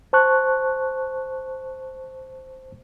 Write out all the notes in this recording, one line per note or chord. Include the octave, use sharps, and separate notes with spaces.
C5 A5 C#6 F#6